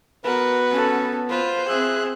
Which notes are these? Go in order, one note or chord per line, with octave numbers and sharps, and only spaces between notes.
B3 F#4 A#4 B4
C#4 A4
F4 B4 C5
C4 G#4 E5 F#6